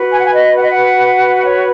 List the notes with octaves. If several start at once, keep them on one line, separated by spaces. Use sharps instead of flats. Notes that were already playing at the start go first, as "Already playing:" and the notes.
Already playing: F#4 B4
G#5
F#5
G#5
D#5
F#5
D#5
F#5
C#5